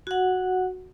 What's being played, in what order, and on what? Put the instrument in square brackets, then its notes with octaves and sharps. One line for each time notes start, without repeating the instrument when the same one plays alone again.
[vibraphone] F#4 F#5